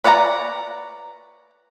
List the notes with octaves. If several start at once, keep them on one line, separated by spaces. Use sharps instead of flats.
B4 C#5 D5 F#5 A#5